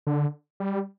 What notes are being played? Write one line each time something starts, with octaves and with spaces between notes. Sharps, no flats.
D3
G3